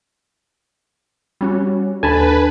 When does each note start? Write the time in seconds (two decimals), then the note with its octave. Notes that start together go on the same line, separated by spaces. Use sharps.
1.41 G3 C#4 F#4
2.03 D#2 D4 A4 B4 G#5 A5 B5